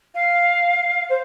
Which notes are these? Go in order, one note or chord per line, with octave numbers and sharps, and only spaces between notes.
F5
C5